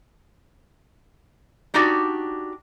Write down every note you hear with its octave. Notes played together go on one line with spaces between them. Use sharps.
D4 D#4 F#4 G4 D5